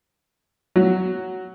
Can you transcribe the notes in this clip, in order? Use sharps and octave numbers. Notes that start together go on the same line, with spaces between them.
F#3